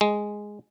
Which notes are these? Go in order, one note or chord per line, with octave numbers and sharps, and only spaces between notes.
G#3